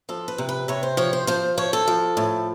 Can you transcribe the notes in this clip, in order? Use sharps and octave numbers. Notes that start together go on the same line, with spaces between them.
F3 A4
B4
C3
B4
C3 C#5
C5
F3 C#5
C5
F3 C5
F3 C#5
A4
F3
A2